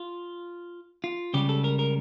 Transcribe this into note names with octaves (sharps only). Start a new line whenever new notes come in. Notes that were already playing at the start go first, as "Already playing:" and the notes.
Already playing: F4
F4
C#2 C#3 G3 G4
A4
A#4
A#4